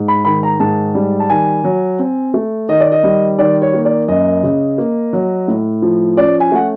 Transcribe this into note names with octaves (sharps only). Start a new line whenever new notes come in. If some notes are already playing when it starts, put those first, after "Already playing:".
Already playing: G#2
B5
D#3 B5
A#5
G#2 A5
G3
A5
D#3 G#5
F#3
C4
A3
D#3 D#5
D5
D#5
G3
D#3 D5
C#5
A#3
D5
F#2 D#5
C#3
A#3
F#3
A2
F3
C#4 D5
G#5
A3 F#5